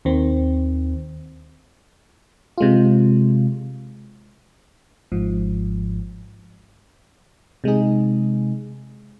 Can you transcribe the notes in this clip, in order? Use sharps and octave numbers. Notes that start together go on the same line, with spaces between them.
D#2 D#3 C4
C3 G#3 F4
G#1 G#2 F3
C3 G#3 D#4 G#4